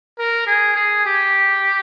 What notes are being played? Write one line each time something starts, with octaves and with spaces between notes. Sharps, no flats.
A#4
G#4
G#4
G4